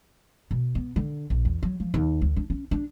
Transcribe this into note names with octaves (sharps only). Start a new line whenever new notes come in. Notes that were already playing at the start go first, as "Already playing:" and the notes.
B2
B3
D3
A#1
E2
F#3
F3
D#2
D2
D4
C#4
D4